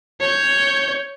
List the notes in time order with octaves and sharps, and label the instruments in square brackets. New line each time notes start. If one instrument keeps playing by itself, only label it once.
[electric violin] C#5 G6